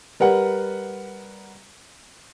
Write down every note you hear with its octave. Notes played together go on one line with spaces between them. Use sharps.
G3 A#4 B4 F#5